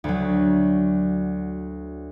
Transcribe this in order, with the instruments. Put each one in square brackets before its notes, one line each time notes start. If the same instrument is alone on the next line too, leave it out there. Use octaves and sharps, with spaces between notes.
[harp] D2 F#3